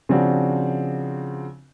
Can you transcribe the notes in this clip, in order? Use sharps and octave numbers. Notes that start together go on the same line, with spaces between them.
C#3 F3 C4 D4 F#4